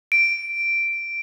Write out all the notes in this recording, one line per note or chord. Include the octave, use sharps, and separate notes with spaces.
D7